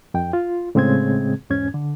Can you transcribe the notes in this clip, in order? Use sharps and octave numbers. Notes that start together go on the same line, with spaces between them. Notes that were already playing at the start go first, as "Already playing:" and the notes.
F2 G5
F4
A2 C#3 G#3 C4 G#4 G#6
E2 G#2 C#4 G#6
D3